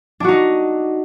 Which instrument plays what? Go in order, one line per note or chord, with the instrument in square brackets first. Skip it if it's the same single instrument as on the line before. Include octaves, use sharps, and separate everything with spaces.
[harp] D4
F#4
D#4